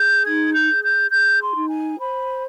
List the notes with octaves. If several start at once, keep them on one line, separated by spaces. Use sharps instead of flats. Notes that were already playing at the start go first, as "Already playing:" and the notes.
Already playing: G#4 G6
D#4 G#6
G6
G#4
G6
G#4 G6
C6
D#4
G#5
C5 B5